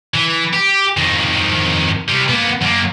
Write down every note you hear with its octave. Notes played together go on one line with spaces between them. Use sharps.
E3
G4
F2 D#3
C3 G3
A#3 B3
F#2 A#3